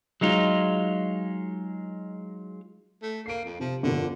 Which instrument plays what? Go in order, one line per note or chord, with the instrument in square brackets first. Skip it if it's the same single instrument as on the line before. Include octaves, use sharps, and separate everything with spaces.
[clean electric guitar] F#3 G#3 D#4 F4
[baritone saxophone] A3
[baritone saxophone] A#3 [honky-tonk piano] C7 D7
[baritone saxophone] F2
[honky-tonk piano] C3 [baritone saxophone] F3
[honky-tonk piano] G1 F2 A#2 [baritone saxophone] D3